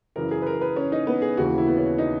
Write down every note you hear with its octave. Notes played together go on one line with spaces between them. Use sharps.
F#2 C#3 E3 A#4
G#4
B4
A#4
B4
C#4
D#4
B3
G#4
D#2 C#3 E3 F#4
E4
B3
C#4
D#4